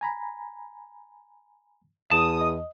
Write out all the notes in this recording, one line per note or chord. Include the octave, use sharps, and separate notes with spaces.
G#5 A#5 B5
E2 A5 D#6
D#5